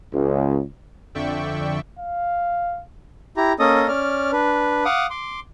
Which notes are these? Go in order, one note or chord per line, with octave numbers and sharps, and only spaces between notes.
C#2
F2 D3 D5 E5 G5 C#6
F5
E4 G4 A#5
A#3 C#4 A4 D#5 D#6
C#4 D5 F6
D4 B4
F5 F#5 D6 D#6
C6 D6